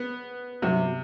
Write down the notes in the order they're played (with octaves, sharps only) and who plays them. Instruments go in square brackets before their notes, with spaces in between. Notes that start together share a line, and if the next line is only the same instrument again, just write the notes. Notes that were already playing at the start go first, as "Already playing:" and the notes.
Already playing: [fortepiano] B3
[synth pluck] G2 F#3 B3 F#4 [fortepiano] C3